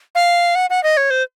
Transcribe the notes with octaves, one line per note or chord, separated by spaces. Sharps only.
F5
F#5
F#5
D#5
C#5
C5